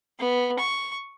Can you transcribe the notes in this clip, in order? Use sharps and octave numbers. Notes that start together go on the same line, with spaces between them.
B3
C#6